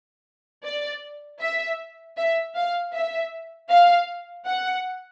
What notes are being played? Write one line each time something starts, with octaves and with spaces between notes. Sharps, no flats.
D5
E5
E5
F5
E5
F5
F#5